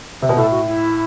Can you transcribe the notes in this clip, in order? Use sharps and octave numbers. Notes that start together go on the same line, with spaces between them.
C3
B2
A2 A4
F#4
E4